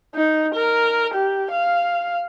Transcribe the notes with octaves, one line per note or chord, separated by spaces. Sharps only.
D#4
A#4
G4
F5